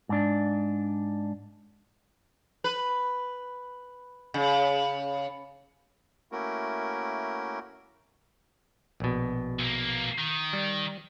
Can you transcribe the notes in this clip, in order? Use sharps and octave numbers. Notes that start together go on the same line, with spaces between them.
G#2 D4
B4
C#3
A3 A#3 C#4 E4 F#4 A#4
A#1 B2
B1 A#3
D#3
G3